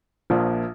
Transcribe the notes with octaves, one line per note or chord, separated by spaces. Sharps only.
A#1 A#2 F3